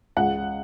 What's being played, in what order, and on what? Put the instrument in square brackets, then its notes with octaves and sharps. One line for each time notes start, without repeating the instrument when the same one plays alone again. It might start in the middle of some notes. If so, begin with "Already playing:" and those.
[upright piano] C#2 C#3 F#5